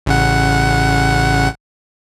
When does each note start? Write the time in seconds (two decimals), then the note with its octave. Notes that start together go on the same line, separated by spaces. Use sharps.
0.06 A1 C#3 F#5